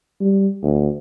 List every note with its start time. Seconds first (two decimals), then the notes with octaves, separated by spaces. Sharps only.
0.21 G3
0.63 D2